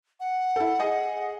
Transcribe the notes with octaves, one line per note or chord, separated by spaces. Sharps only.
F#5
E4 A4
G#4 D#5 G#5